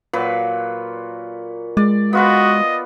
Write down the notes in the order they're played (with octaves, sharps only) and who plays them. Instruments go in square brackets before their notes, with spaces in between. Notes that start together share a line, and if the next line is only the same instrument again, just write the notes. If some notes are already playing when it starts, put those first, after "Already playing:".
[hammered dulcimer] A#2 F#3 B4
[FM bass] G#3 [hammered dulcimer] D5
[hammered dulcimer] B3 F4 B4 [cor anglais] F#4 [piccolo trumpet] D#5